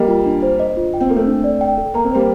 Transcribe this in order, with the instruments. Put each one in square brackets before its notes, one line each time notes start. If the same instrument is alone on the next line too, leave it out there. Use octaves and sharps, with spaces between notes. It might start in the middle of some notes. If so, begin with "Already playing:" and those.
Already playing: [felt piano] G3 A#3 [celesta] D#5
[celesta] F4
D4
C5
D#5
F4
G5
[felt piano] C4
[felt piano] A#3 [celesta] A4
[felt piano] A3 C4
[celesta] D4
D5
G5
A4
[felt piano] A#3 [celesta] A#5
[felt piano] C4
[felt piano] G3 A#3 [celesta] C5